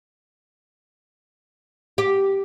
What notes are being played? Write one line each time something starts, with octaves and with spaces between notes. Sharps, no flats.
G4